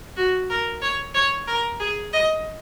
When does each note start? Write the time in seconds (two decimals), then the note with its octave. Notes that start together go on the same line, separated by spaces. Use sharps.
0.17 F#4
0.50 A#4
0.82 C#5
1.14 C#5
1.47 A#4
1.80 G#4
2.13 D#5